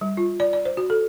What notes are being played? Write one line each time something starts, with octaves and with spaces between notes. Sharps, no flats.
G3
F4
D5
D5
C5
F#4
A4